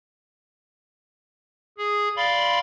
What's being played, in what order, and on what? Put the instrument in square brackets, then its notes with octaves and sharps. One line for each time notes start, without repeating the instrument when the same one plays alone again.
[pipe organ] G#4
D5 F5 B5 C6